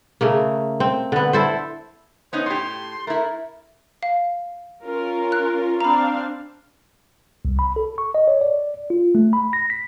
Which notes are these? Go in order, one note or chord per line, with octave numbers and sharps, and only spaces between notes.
C#3 A3 A#3
C4
D3 B3
E4 A4 C5
B3 C#4 D#4 C5
A2 G4 C6
A3 E4 A#4
F5
C#4 F4 A#4
F#6
C4 D4 F5 A#5 B5
C2
B5
A4
C#6
D#5
C#5
D5
F4
A3
B5
A#6
B6